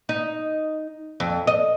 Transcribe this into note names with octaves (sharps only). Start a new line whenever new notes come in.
D#4
F2
D#5